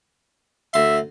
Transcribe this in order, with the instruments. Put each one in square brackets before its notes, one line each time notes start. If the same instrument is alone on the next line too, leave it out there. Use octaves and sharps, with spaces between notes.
[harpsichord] D2 C6 [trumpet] E5